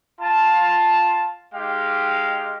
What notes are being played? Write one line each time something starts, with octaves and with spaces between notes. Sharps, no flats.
F4 A5
G#3 D#4 G4 F5 G5